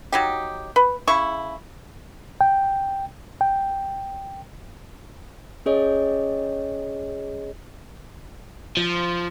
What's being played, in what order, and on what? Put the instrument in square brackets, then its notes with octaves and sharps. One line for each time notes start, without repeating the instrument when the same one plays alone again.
[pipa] F#3 D#4 G4
B4
C#3 E4 C#6
[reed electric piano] G5
G5
[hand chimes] C#4 G#4 C#5 D#5
[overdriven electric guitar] F3